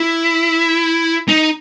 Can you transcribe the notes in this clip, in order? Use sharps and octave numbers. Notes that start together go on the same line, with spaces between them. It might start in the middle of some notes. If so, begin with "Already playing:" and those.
Already playing: E4
D#4